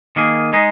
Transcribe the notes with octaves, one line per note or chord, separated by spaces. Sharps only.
D#3 A#3 G#4
G#3 D#4 G#4